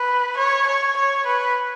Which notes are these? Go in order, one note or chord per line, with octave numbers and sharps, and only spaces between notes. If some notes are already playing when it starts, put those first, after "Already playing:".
Already playing: B4
C#5
C#5
C#5
B4